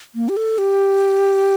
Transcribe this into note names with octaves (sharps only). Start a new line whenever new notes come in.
A#3
G4
A4
G4